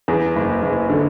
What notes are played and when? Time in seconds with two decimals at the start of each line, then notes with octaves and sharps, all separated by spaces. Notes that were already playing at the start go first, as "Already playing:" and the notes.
0.08 E2
0.36 F#1
0.62 F#1
0.90 D3